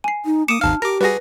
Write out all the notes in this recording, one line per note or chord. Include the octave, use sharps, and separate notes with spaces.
G#5 C7
D#4
A#3 D6 D#6 C#7 E7
G#1 D#2 D#4 F5 A5 F6
G4 A#4 D6 A#6
G3 F#4 G#4 B4 A#6